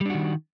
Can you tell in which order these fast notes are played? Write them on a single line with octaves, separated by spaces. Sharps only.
G3 D4 F#4 D#3